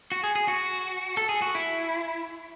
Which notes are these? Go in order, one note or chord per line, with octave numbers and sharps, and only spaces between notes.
F#4
G#4
G#4
F#4
A4
G#4
F#4
E4